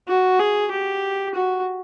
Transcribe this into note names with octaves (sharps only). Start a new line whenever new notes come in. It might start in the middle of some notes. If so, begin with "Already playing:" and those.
F#4
G#4
G4
F#4